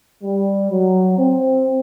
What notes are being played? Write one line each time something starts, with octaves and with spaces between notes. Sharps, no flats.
G3
F#3
C4